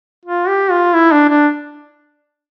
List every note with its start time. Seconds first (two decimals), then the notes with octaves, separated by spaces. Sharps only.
0.25 F4
0.48 G4
0.71 F4
0.94 E4
1.12 D4
1.29 D4